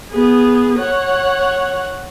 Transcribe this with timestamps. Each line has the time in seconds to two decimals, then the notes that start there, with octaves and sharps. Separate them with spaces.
0.10 B3 G#4
0.79 C#5 F#5